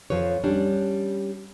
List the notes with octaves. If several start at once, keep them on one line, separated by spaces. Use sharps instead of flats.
F2 F3 B4 C#5
G3 C#4 D4